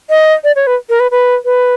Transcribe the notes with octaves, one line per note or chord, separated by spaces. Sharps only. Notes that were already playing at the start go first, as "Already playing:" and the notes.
D#5
D5
C#5
B4
A#4
B4
B4
B4